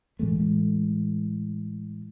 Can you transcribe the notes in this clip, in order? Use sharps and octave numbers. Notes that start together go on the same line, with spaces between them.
A2 E3 G#3 A3